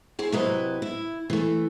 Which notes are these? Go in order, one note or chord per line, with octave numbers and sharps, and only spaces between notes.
E4 G#4 C5
C3 F#3 E4 B4 D#5
E4
E3 A3